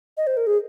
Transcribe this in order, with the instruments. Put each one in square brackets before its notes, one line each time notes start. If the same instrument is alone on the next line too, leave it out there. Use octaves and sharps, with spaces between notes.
[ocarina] D#5
C5
A#4
G#4